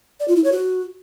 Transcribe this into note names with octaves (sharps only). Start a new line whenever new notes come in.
D5
F4
E4
C#5
F#4